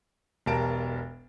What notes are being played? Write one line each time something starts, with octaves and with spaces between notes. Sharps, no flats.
E1 B1 G4 A#4 A5 D7